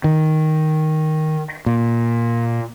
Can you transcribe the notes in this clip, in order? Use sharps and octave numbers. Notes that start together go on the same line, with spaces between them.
D#3
A#2